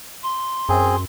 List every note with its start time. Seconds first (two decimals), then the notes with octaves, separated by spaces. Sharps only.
0.23 C6
0.69 F#2 C4 G#4